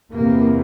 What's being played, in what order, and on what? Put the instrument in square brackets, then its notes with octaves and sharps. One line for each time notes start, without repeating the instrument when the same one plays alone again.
[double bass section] E2 C3 A#3